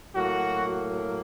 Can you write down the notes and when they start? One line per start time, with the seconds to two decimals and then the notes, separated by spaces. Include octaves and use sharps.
0.14 A2 F#3 A#3 F#4